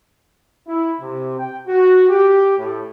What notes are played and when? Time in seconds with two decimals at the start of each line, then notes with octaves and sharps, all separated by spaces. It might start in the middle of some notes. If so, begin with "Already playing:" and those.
0.68 E4
1.00 C3
1.38 G5
1.68 F#4
2.09 G4
2.58 A2